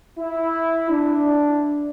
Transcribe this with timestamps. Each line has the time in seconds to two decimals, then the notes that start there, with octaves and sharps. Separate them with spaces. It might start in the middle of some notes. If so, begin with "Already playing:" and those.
0.19 E4
0.90 D4